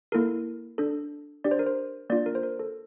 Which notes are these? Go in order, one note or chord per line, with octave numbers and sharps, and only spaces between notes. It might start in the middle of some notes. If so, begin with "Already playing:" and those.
A#3 E4 A4 A#4
D4 A4
D4 G4 D5
C5
A#4
C5
A#3 D4 F4 D5
A#4
C5
A#4
A4